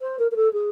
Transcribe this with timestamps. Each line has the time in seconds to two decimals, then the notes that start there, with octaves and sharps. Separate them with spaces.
0.01 C5
0.18 A#4
0.31 A#4
0.36 A4
0.53 G#4